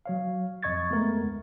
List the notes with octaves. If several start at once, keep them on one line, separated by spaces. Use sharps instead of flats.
F#3 C#5 F5
F2 D#5 C#6 G#6 A6
G#3 A3 B3 A#4
D2